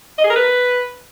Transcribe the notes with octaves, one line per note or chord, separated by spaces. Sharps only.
D#5
G#4
A#4
B4